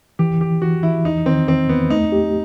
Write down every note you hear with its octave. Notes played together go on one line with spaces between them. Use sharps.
E3 G4
E3 G4
E3 F#4
E3 E4
E2 D#4
D#3 C4
E2 C4
E2 B3
A3 D#4
G4